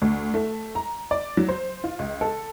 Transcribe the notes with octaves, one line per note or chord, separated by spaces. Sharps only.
D2
A3
A#5
D5
F#3
C5
F4
C#2
A4